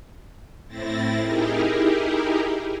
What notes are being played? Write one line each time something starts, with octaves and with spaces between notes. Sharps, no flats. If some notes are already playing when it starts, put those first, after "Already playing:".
A2 C4 E4 A6 A#6
D#4 E4 G4 G#4 A#4